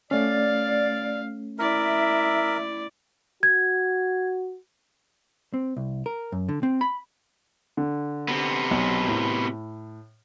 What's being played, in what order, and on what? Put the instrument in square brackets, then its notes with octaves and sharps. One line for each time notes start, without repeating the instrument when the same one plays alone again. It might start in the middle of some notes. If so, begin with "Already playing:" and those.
[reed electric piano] A3 C#4 [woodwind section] D5 [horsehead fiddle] F5
[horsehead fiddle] E4 D5 [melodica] A#4 [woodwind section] E5
[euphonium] F#4 [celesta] G#6
[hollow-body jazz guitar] C4
C2
A#4
F#2
D3
C4
B5
[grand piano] D3
[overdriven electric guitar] C3 B3
[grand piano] B1
A2